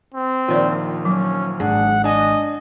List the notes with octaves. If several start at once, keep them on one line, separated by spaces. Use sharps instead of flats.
C4
A#1 D#3 F3 F4 C#5 D5
F#3 C#4
G#1 D4 G#4 F#5
D4 D#5 G#5